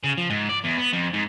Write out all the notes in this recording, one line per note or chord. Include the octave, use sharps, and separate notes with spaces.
C#3
F3
G#2
D5
E2
B3
F2
G#2